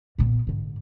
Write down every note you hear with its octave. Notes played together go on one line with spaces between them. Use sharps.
A#2 B3
G#2 D3